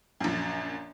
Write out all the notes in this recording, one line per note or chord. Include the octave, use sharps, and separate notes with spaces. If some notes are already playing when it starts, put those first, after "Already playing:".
A#1 F#2